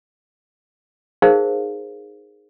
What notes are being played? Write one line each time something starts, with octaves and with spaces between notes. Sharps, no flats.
D#4 G#4 A#4 C5 F5